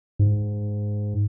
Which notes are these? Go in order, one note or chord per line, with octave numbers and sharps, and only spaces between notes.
G#2